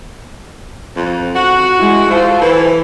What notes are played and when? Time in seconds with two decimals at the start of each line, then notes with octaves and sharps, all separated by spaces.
0.96 F2
1.35 F#4 F#5
1.77 G#3 E4
2.11 F4 A4 C5
2.42 E3